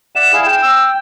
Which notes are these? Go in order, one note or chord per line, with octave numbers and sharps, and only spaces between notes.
D5 E5 F#5 E7
E4 G#4 F5
G5
E6